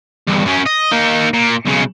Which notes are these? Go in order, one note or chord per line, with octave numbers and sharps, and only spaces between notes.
E2 G2
F#2 C#4
D#5
A#3 D#4
A#2
B1 C#3